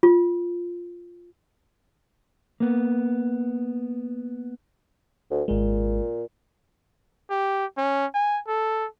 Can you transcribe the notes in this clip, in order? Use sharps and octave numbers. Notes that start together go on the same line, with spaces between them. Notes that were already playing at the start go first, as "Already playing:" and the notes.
F4
A#3 B3
D2
G#1 A#2 G#3
G4
C#4
G#5
A4